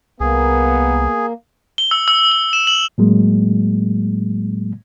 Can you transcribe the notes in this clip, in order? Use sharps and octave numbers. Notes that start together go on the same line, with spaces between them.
C2 A#3 B3 G#4
G7
E6
E6
E6
E7
F#7
A2 F#3 G#3 A#3